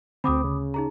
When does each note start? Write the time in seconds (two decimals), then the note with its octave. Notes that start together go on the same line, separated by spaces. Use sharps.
0.24 D2 D3 C4 B5 D6 D#6
0.44 C#3
0.74 D#4 G#4 A#5